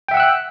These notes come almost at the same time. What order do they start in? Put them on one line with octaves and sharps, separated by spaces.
G5 E5 F#5 E6 F#6